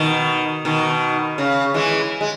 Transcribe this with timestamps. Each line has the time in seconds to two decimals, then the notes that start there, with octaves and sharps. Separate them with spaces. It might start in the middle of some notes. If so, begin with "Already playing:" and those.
Already playing: B2 D#3
0.65 B2 D#3
1.38 C#3
1.74 E3 G#3
2.21 G#3